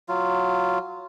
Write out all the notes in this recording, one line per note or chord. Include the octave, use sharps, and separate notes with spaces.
F#3 F4